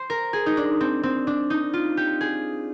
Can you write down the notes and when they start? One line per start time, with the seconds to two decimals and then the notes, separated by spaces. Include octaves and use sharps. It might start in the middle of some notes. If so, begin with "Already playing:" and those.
Already playing: C5
0.10 A#4
0.33 G#4
0.46 D#4
0.57 D4
0.81 C4
1.03 C4
1.27 D4
1.50 D#4
1.73 F4
1.97 G4
2.21 G#4